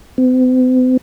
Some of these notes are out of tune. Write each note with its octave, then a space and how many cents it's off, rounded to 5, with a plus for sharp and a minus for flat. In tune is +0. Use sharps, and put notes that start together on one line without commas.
C4 -45